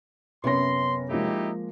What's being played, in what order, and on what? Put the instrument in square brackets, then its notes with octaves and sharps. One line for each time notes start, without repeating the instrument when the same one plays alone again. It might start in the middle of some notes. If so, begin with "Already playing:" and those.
[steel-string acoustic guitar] F#2 C3 [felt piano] B3 C#4 A#6 [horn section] C6
[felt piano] F3 G#3 A#3 [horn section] D#4 E4 G4